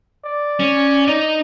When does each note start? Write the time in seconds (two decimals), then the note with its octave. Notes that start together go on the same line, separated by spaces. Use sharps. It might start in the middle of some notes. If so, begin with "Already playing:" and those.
0.25 D5
0.60 C#4
1.08 D#4 D#5